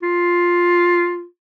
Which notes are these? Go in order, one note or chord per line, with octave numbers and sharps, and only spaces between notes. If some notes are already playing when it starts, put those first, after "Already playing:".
F4